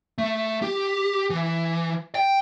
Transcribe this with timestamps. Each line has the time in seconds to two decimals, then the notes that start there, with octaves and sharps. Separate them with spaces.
0.18 A3
0.62 G4
1.30 E3
2.15 G5